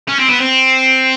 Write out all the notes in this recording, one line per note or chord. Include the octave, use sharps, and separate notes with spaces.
C#4
C4
B3
C4